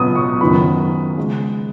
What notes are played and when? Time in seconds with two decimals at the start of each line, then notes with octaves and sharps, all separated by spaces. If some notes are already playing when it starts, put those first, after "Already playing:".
Already playing: C#2 B2 F#3 B3 D#6
0.15 C#6
0.41 F#1 F#2 D#3 F#3 B3 B5
1.18 C#3 G#3